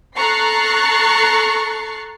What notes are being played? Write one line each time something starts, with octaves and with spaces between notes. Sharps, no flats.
A4 A#5 C#6 F#6 A6 C7